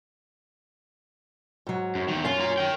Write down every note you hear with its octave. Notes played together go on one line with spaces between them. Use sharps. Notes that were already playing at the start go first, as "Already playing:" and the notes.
G#2 F#3
F#2
E2 D#3
F#2 C#4 F4
F4 A#5
A#4 G5